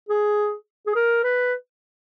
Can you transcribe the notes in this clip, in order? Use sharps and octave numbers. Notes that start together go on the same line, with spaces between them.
G#4
G#4
A#4
B4